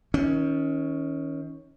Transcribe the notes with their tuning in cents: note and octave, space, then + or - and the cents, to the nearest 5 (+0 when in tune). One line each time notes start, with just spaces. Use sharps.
D#3 +30 C#4 +0